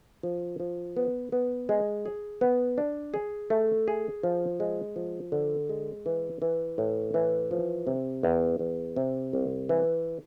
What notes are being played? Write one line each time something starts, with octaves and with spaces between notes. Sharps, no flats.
F3
F3
B3
B3
G#3
G#4
B3
D4
G#4
A3
G#4
F3
G#3
F3
D3
G#3
E3
E3
A2
E3
F3
C3
E2
E2
C3
C2
E3